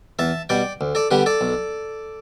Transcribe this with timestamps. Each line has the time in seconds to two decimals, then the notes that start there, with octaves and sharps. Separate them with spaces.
0.19 E2 E5 A5
0.49 B2 G3 D5 G5
0.81 D2
0.95 A4 D5
1.11 D3 G3 B3 G4 B4
1.26 A4 D5
1.41 B1